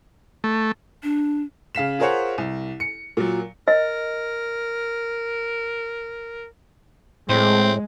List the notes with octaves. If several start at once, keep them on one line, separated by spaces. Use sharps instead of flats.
A3
D4
C#3 F5 B6 E7
F4 G#4 A#4 C5 C#5 F#5
C2
C#7
A#2 F#3
A#4 D#5
A2 G#3 C4